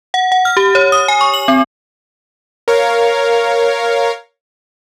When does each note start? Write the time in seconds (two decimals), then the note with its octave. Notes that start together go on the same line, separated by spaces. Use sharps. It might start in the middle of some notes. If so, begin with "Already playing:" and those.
0.14 F#5
0.32 F#5
0.45 F6
0.57 G4
0.75 C#5
0.92 D#6
1.08 G#5
1.21 C#6
1.34 F#7
1.48 C4
2.68 A#4 C#5 F5